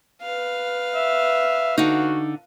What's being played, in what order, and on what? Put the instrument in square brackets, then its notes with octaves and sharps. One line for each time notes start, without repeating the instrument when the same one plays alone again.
[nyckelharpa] B4 F5
[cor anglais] E5
[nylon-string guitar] D3 D#4 [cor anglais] F#4